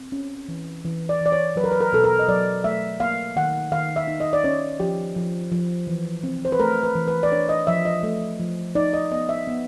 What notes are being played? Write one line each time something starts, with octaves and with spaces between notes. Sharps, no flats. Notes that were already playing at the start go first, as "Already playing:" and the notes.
Already playing: C4
C#4
E3
E3
D5
E3 D5
C#5
F#3 B4
A#4
B4
A#4
B2 A4
A#4
D#5
F#3 D5
A3 E5
A#3 F5
D#3 F#5
D#3 F5
E5
D#4
D#5
D5
C#4 C#5
F3 G4
F3
F3
E3
C4
C5
B4
A3 A#4
B4
E3
B4
D5
D4 C#5
D#5
F3 E5
D#5
A3
F3
D#4 D5
D#5
B3 D#5
E5
B3